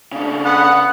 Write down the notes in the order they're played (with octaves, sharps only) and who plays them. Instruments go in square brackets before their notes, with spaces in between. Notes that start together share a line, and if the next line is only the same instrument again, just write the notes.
[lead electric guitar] C#3 D4
[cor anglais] B3 [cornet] F#5